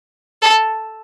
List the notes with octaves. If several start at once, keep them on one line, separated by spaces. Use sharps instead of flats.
A4